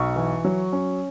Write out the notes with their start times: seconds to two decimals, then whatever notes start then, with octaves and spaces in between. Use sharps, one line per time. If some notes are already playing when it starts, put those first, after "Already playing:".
Already playing: B1 C#6
0.16 E3
0.45 F#3
0.72 C#4